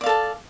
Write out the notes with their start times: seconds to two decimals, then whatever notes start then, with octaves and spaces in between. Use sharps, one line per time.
0.01 D5
0.04 F5
0.06 A4
0.09 A5